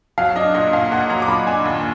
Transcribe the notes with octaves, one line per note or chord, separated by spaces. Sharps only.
F#3 F5
D4 D#5
A#2 D#5
A#2 F5
A#2 F#5
F#3 A#5
D6
A#2 B5
D4 G#5
D#2